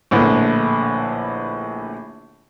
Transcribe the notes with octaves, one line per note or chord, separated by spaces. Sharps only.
A#1 A2 D3 B3